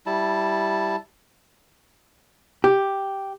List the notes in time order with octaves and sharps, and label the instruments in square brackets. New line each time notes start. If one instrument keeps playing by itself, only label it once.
[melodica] G3 E4 A5
[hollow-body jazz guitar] G4